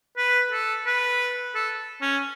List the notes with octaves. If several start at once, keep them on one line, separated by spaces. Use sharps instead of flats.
B4
A4
B4
A4
C#4